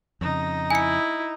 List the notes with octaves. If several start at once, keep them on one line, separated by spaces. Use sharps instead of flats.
F2 C#3 D#4
E4 G#5 C#7